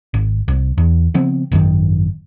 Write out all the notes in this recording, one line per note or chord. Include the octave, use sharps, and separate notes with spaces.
G#1
C2
E2
C#3 F3 B3 C4
G#1 F#2 C3 D#3